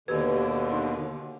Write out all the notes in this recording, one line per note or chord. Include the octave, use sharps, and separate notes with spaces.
D#2 B2 D3 D#3 G4 B4
D#4